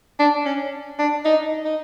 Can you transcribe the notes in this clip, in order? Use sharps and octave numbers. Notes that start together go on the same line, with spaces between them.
D4
C#4
D4
D#4
D#4